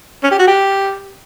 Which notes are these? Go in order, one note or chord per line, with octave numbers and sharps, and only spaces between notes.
C#4
G4
F#4
G4